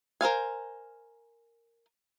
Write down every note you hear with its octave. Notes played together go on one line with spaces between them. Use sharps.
A#4 C5 F5 G#5